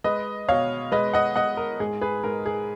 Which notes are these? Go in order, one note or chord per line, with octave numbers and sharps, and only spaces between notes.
G#3 B4 D#5
B2 C#5 F5
G#3 B4 D#5
D#5 F#5
G#3 D#5 F#5
A#4
G#2 G#4
G#4 B4
G#2 A#4
G#4